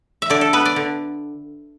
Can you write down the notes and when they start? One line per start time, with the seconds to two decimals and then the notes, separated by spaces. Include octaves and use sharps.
0.22 E5
0.30 D3 D5
0.41 A4
0.53 B3 B4
0.66 D5
0.76 D3